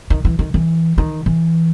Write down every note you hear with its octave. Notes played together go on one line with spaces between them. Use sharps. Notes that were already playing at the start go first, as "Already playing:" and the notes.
D#3
E3
D#3
E3
D#3
E3